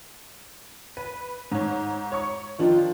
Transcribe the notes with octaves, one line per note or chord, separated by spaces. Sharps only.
B4
G#2 C#5
C#5 C#6
D#3 F3 D4 F4